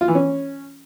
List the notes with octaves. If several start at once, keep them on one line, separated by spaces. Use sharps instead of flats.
F4
E3
C#4